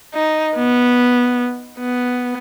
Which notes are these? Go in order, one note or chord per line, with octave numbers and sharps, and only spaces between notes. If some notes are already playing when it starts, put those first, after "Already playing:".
D#4
B3
B3